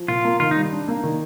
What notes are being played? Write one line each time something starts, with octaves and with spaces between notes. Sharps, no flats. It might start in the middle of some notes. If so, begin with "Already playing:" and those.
Already playing: F3
A#2 F4
A#3
D#3 F4
D#4
G3
D4
A#3
D#3